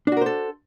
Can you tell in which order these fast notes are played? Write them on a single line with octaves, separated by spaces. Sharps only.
D4 F#4 A#4 C5 A4